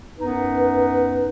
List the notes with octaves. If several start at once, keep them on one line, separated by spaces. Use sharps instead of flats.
F#2 B3 D#4 B4